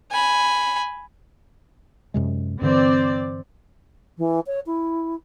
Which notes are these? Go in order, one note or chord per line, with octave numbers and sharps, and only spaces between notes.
G#5 B5
F#2 C3 G#3
G2 D3 E3 C4 D5
E3
C#5
E4